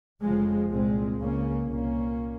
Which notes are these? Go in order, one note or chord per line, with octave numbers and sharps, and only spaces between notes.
F1 F2 C#3 F3 G#3
C2 A#2 G#3 C4
C#2 C#3 A#3 C#4
C2 A#2 A#3 C#4